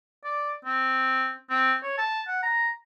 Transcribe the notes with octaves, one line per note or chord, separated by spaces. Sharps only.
D5
C4
C4
C#5
A5
F#5
A#5